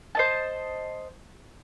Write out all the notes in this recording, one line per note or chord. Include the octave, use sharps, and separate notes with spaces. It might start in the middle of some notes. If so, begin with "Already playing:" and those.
C5 D#5 A5